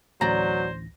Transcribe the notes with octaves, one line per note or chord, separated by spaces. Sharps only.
A1 D2 F#3 C5 D5 A#5 A#6